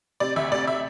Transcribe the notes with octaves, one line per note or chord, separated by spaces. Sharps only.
C3 D5
D2 E5
C3 D5
E5